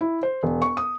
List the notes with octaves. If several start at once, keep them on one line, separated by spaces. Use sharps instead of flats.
E4
C5
E1
C#6
D#6